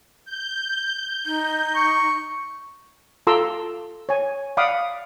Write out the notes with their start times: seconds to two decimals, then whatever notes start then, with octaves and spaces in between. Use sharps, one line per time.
0.25 G6
1.26 D#4
1.76 C#6
3.27 F4 A4 A#5 C6 D6 E6
4.09 C#5 G#5
4.57 D5 F5 F#5 B5 D6 D#6